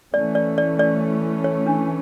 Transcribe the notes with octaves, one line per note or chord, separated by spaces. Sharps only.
E3 A3 C#4 D5
D5
D5
D5
C#5
D4